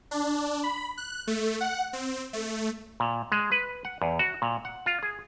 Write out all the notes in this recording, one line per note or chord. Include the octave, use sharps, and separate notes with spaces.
D4
B5
F#6
A3
F#5
C4
A3
A#2
G#3
B4
F#5
E2
F#4
A#2
F#5
F4
G#4